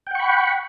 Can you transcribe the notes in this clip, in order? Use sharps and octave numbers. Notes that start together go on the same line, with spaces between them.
F#5 G5 B5 C#6